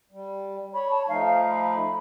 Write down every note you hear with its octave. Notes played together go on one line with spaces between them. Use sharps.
G3
C#5 B5
A5
F3 A3 D#4 F5
B5